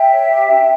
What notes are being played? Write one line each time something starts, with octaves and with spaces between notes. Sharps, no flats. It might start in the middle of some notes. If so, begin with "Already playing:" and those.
Already playing: E5 G5
C#5
G4
D4